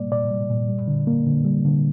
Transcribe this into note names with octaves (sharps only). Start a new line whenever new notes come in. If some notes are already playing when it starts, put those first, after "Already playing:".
Already playing: A#2 G3 A#3 D5
A#2 D5
G3
A#2
G3
D3
A#3
D3
G3
D3